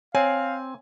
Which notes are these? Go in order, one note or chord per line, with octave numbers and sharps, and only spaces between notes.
C4 C#5 F5 G#5